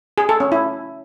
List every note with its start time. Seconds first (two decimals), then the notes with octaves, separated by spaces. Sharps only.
0.18 G#4
0.29 A4
0.40 C#4
0.52 E4